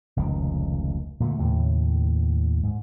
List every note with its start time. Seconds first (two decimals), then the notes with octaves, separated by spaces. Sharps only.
0.17 F1 C#2 D#3
1.20 A#2 D3 D#3 A3
1.38 D#2 A2 C#3
2.63 G#2